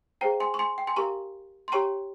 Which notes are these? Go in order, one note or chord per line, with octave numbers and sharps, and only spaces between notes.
G#4 C5 F5 G5 A#5
G#5 C6
C#6
G#5 C6
G5
G#5 C6
G4 A#4 F5 A#5 C#6
C6
G4 C#5 G5 A#5 C#6